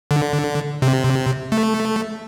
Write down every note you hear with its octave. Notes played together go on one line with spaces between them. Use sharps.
D3
C3
A3